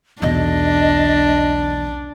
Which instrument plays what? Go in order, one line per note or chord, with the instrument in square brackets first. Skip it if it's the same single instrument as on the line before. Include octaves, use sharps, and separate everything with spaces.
[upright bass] B1 E2 [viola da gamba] D4 [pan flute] D#5